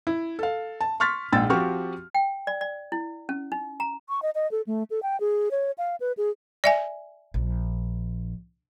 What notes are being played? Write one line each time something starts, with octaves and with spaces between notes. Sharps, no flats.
E4
A4 F5
A5
C6 C#6 F6 A6 B6
A#1 G#2 G5 E6 A6
F3 C4 F#4 G4 C#6 F6
G5
D5
D5
E4
C#4
D#4
A#5
C#6
D#5
D#5
A4
A3
A4
G5
G#4
C#5
F5
B4
G#4
D5 E5 G#5
A#1